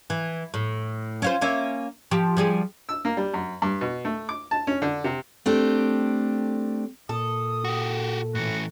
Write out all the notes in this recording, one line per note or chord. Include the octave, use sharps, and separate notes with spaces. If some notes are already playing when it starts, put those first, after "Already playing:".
E3
A2
C#4 F4 C5
A#3 C#4 E5
F3 G4
F3 G3 G#4
E6
A#3
G3
F#2
G2
B2
A3
D6
A5
C#4
D3
C3
A3 C4 D4 G4
A#2 A4 D#6
F#4 G4
A2 E3 F#4